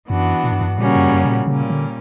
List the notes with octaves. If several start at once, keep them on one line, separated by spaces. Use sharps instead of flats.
F#2 E3 B3 D4 F#4
A#2
G2
F#2
G2
A#2 C#3 G3 A#3 C#4 F#4
F#2
F#2
B2
A#2
A#2 C#3 G3 A#3 C#4
D3